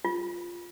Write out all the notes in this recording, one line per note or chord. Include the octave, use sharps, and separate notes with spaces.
F4